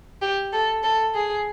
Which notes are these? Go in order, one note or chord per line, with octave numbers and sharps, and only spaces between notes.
G4
A4
A4
G#4